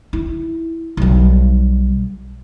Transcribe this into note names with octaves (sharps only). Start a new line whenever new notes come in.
E4
B1 G3